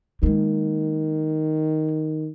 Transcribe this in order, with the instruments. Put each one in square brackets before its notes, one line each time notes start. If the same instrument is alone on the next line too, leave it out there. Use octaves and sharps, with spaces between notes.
[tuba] D#3 [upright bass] G#3 A#3